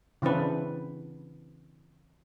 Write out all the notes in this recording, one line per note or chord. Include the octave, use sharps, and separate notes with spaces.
C#3 E3 C4 D4 B4